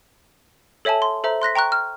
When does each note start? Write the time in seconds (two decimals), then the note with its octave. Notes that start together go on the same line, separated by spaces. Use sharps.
0.85 A4 C#5 E5 G#5 A5
1.02 C6
1.24 A4 C5 E5 A#5
1.42 C6 F#6 A#6 B6
1.55 G5 A#5 C#6 F#6
1.72 F6